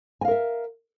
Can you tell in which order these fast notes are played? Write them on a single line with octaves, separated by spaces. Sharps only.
G#5 F5 A#4 E5